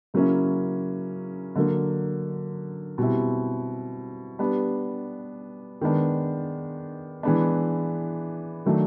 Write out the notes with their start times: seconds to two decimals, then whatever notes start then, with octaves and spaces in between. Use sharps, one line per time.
0.14 C#3 F#3 A#3 C#4 E4
1.56 D3 F#3 A#3
2.98 B2 G3 C4 E4
4.39 G3 B3 D4
5.81 D#3 G#3 B3 D4
7.23 E3 G#3 B3 D4
8.66 D#3 F#3 A3 D4